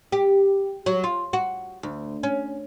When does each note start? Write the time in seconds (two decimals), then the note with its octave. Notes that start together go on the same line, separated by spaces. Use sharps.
0.12 G4
0.86 F#3
1.04 F4
1.33 F#4
1.83 D2
2.23 C#4